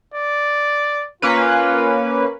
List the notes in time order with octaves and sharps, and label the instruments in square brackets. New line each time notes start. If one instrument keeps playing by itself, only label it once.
[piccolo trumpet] D5
[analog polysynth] A#3 C#4 B4 [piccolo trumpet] F4